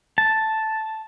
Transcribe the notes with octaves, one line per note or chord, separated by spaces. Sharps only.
A5